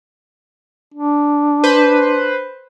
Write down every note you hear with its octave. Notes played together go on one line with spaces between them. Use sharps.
D4
B4 C5